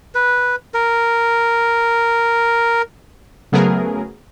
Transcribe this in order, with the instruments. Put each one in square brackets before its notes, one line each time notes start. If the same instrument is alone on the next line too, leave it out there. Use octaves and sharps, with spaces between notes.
[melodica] B4
A#4
[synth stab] C#3 F#3 A3 B3 G#4 A#4